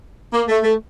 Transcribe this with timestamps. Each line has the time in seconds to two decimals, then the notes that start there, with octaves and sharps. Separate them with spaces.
0.34 A#3
0.48 A3
0.64 A3